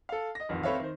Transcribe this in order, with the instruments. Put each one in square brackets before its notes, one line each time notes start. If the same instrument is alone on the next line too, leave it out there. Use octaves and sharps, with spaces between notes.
[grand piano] A4 F5
D#5 A#6
A1 F2 D#3
A3 C4 B4 C#5 E5 F5
D#3 C5